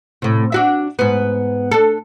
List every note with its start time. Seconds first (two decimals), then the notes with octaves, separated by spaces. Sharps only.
0.22 A2 C3
0.52 D4 F#4 E5
0.99 G#2 B3
1.71 D4 A4